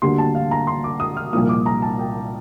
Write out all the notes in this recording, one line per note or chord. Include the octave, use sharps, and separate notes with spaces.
D2 D3 G3 A#3 C6
A5
F5
A#5
C6
D6
D#6
F6
C2 A#2 F3 A#3 D#6
D6
A#5
A5
G5